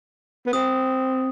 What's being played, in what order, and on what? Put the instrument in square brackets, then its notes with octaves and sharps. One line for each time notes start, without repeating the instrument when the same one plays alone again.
[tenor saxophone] B3
[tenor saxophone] C4 [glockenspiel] D#6